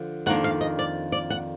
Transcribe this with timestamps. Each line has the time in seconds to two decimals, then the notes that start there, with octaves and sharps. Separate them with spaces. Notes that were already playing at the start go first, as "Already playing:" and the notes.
Already playing: D3 F3
0.26 F2 D#3 A#3 D4 F#5
0.44 F5
0.61 D#5
0.79 D5
1.12 D5
1.30 F#5